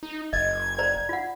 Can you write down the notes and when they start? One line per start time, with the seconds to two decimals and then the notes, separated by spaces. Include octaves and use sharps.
0.03 D#4
0.33 F#1 D#5 G#6
0.78 C5 D5 A#5
1.09 F4 F#5